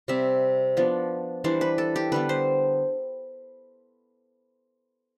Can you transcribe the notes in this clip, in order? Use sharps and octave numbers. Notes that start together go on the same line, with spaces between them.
C3 G3 C4 E5
F3 B3 D4
E3 G3 D4 C5
B4
A4
G4
D3 G3 B3 B4
C5